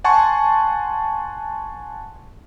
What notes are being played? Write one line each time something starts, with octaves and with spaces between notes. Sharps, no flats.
F#5 G#5 A5 C6 C#6